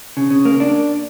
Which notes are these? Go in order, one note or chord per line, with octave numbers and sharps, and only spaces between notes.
C#3
C#3
A#3
D4